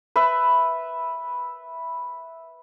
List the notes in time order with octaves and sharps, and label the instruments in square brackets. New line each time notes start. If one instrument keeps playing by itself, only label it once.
[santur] B4 E5